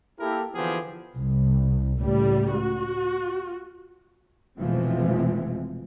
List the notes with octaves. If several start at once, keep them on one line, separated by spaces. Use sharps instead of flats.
A#3 E4 G4 A4 A#4
D3 E3 F3 B3 G4 G#4
C2
C#2 A2 G3
F#4
F1 B2 E3 F3 G#3 C4